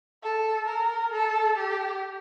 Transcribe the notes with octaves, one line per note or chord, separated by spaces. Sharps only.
A4
A#4
A4
G4